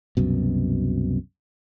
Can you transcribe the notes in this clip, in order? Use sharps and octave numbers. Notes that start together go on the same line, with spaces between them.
C2 F#2 B2